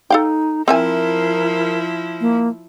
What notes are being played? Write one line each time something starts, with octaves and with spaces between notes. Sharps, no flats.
D#4 A4 F5 G5
F3 C4 E4 A#4 E5 G#5
A#3